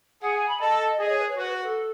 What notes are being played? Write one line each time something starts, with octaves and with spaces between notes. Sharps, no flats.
G#4 F#5
G#5
B5
A4 D#5
G#4 D#5
C#5
B4
C#5
F#4 B4
B4
A4